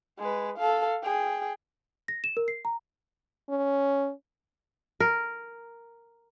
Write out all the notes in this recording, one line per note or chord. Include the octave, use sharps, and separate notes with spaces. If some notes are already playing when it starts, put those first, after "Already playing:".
G#3 B4
A4 F5
G#4 G5
A#6
E7
A#4
C7
A#5
C#4
A#4